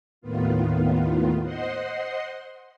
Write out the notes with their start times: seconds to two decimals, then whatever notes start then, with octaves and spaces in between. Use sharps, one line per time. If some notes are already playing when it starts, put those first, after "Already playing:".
0.21 D#2 A2 D#3 B3 F4
1.42 C5 D#5 F#5 C6